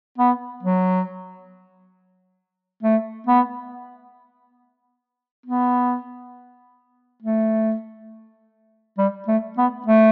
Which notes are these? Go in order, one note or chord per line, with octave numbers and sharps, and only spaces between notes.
B3
F#3
A3
B3
B3
A3
G3
A3
B3
A3